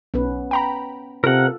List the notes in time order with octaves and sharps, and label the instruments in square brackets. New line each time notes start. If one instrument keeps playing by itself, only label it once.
[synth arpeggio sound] B1 [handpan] B3 C#4 B4
[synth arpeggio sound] G5 A#5 B5
[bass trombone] C3 [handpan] F4 A4 [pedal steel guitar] A#4 F#5